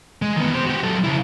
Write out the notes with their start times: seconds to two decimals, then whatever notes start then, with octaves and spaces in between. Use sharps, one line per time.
0.22 G#3
0.36 D#3 B3
0.54 G4 C5
0.67 F#4 G4
0.84 F#3 A4
1.04 C#3 E4